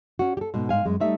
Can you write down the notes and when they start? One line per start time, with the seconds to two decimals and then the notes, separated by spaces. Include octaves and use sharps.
0.19 C#4 F#4
0.37 G4 A4
0.54 G#2 B2
0.69 G#2 F5 G#5
0.85 F#2 G#3
1.00 G3 A3 D#4 E5